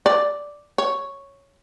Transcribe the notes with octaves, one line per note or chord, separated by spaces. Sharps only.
D5
C#5